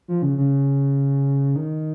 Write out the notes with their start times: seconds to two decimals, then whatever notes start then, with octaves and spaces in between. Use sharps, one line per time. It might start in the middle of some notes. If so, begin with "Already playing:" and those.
0.08 F3
0.22 C#3
0.37 C#3
1.56 D#3